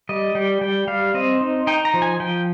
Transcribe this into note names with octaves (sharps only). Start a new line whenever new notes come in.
G3 D#5
G3 G5
G3 G5
G3 F5
C4 D#5
D#4
D#4 G5
A#5
F3
G#5
F3 G5